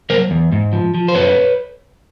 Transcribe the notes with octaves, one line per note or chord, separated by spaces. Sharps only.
F#3 A#4 C5
E2
G#2
F3
F3
C5
F#2 B4 C#5